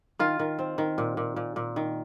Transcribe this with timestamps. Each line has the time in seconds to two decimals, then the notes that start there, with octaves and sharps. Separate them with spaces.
0.19 D#3 F4
0.39 D#3
0.59 C4
0.78 D#3
0.98 A#2
1.17 A#2
1.36 A#2
1.56 A#2
1.76 D#3